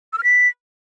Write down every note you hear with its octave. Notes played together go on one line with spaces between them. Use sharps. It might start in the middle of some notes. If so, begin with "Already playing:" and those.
E6
F6
B6